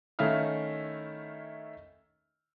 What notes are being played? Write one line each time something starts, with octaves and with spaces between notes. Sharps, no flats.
D#3 A3 C#4 E4 F5 F6